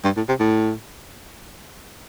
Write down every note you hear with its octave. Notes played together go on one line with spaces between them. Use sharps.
G2
A2
C3
A2